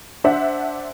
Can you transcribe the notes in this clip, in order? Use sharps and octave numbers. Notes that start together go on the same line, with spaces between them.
D4 C5 E5 F#5